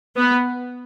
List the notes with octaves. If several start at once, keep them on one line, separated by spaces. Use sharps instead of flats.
B3